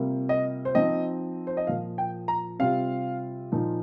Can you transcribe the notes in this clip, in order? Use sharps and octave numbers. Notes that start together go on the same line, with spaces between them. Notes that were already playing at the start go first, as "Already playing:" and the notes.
Already playing: C3 G3 A#3 F4
D#5
C5
F3 C4 D#4 D#5
C5
D#5
A#2 F3 A#3 F4 F5
G5
A#5
C3 G3 C4 F4 F5
A#2 F3 D#4